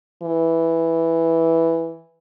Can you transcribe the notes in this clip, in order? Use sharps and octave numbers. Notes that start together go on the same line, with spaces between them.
E3